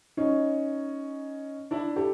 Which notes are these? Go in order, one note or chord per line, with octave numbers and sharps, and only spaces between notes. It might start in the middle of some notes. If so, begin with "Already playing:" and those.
C#4 D#4
D4 E4
G4 A4